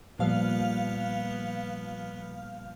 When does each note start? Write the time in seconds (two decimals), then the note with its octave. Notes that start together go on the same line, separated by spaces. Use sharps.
0.19 A#2 F3 G3 B3 F5 F6